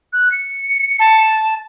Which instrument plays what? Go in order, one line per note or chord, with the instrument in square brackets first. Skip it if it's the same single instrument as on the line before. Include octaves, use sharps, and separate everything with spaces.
[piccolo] F#6
C#7
[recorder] A5